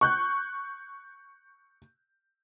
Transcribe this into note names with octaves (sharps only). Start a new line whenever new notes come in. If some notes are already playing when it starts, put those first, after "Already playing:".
C#6 F#6 G6